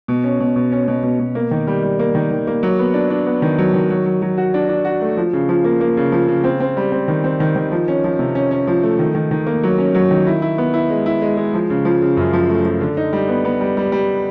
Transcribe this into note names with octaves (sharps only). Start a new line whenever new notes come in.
B2
C#4
B2
B2
C#4
B2
B2
B2
A#3
D#3
G3
G3
A#3
D#3
D#3
A#3
F#3
B3
D4
D4
B3
D#3
F#3
D#3
F#3
F#3
F#3
F#4
D4
D4
F#4
A3
F3
C#3
F3
A#3
A#3
C#3
F3
C#3
C4
C4
G3
C4
D#3
C4
D#3
D#3
F3
C#4
F3
C3
C#4
C#4
F3
A3
D#3
D#3
D#3
A#3
F#3
C#4
F#3
D#3
E4
E4
B3
E4
G#3
E4
G#3
G#3
F3
C#3
F3
C#3
F#2
F3
A3
F3
D3
D#4
G3
B3
B3
G3
G3
G3